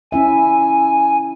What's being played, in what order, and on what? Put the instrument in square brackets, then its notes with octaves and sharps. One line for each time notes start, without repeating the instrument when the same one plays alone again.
[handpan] C#4 E4 E5 [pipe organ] G#5